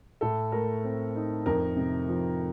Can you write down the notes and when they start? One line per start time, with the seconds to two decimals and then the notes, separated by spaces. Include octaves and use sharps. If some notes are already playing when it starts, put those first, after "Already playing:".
0.21 A2 A4
0.52 A3 A#4
0.84 C4
1.15 D#4
1.46 F2 A#4
1.76 C3
2.09 F3